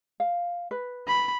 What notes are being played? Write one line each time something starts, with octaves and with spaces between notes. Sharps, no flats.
F5
B4
B5